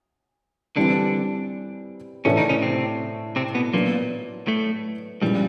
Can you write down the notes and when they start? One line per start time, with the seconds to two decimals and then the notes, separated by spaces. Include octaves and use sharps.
0.76 D3 E3 G3 C4 D4
2.25 A2 C#3 E3 A3 C#4 D4
2.37 D#3 D#4
2.49 C#3 C#4
2.62 C3 C4
3.36 C3 C4
3.55 B2 B3
3.73 A#2 F#3 A#3 B3 D4
4.47 A2 A3
5.22 G2 A#2 F3 G3 G#3 C#4 E4